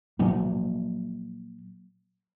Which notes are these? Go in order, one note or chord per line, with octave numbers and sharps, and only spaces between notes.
A#2 F3 F#3 A#3